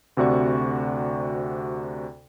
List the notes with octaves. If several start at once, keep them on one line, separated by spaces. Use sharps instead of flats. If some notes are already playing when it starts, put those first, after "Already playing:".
D2 C3 F#4 D5 C#6